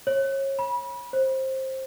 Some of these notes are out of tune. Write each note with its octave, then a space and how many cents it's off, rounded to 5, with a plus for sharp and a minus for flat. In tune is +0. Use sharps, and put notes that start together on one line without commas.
C#5 -30
B5 -30
C5 +15